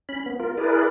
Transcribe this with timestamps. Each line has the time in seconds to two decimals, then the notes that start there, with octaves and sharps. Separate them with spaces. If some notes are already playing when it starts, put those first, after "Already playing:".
0.09 C#4 B5
0.26 B3
0.40 F4 A#4
0.57 E4 G#4 A#4 B4 D5